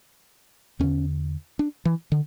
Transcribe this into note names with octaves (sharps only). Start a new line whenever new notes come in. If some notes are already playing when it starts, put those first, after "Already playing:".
E2 D3 C#4
D4
E3
D3